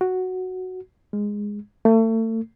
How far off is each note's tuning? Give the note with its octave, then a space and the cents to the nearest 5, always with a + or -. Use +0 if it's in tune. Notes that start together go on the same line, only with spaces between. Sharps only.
F#4 +0
G#3 -10
A3 +35